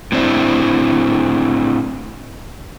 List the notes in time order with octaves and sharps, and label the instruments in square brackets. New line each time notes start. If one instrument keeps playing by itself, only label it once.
[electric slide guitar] A2 C4 D4 E4